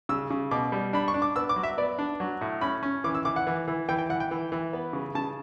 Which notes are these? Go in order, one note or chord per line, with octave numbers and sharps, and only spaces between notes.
C#3 E6
C#3
B2 D6
G3
D4 B5
C#6
D4
D6
B3 E6
D6
F#3
E5
B3 D5
D4
F#3
A2
C#4 B5
C#4
E3 D6
E6
E3 D6
F#5
E3
E3
E3 G5
G5
E3 F#5
G5
E3
E3
B3
C#3
C#3 A5